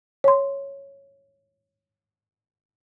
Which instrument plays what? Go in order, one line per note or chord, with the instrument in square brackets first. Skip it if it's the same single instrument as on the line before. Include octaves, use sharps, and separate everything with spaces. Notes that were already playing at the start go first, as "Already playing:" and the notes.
[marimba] C#5 C6